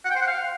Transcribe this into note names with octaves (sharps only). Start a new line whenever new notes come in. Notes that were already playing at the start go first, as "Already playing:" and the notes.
F#5
G5
C5
F#5
F5